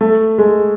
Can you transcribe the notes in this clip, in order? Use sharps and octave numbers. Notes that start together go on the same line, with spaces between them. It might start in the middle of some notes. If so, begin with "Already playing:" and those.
A3
G#3